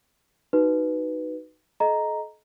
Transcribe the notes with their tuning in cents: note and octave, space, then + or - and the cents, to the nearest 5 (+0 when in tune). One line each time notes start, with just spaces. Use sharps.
D#4 +0 F#4 +20 B4 +0
A4 -40 D#5 +0 A#5 +0